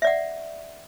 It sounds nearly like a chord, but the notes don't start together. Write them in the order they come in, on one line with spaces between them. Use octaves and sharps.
E5 D5 F#5